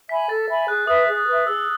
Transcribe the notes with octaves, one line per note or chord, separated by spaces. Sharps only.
E5 G#5 B5 B6
A4 A6
E5 G#5 B5
G#4 F#6
B4 E5 D#6
G#4
B4 E5
G#4 E6